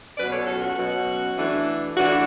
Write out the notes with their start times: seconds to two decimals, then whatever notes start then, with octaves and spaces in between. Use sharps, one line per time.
0.17 B2 F#3 C#4 B4 D5
0.32 A4 C#5
0.47 F#4 A4
0.62 F#4
0.77 B2 F#3 C#4
1.37 E3 A3 D4
1.96 E3 A3 D4 F#4